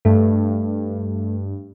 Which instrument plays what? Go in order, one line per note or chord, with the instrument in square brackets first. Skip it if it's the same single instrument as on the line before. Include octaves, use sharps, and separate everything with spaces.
[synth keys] G2 [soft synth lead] A3